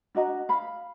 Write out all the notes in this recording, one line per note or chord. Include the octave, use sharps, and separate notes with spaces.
D4 F#4 D#5 A#5
F5 B5